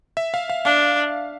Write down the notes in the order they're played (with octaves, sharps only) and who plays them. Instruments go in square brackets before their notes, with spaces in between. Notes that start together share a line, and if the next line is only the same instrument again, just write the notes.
[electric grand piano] E5
F5
F5
[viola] D4 [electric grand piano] F5